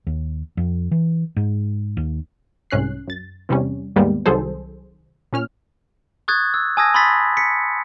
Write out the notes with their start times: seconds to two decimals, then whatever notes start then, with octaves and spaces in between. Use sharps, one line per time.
0.07 D#2
0.57 F2
0.91 E3
1.36 G#2
1.97 D#2
2.71 C2 G#2 C#4 F#6 C7
3.08 F#2 A6
3.49 E2 C3 G3 C#4
3.96 D#2 G#2 G3 G#3 A#3 B3
4.26 C2 D#3 F#3 G#4 A4 C5
5.33 A#2 C#4 F6
6.28 C#6 D#6 F#6 G#6 A6
6.54 E6
6.77 G#5 A5 D#6 E6 G#6 A#6
6.94 B5 C6 D#6 E6 A6 B6
7.37 B6 C#7